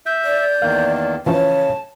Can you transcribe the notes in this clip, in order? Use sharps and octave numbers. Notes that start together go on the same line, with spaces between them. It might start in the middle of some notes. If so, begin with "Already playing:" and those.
E5 G6
D5
E2 D#3 A#3 F5
C#3 E3 F3 C#4 C#5 A5